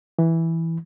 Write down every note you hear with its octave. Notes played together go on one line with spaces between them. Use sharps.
E3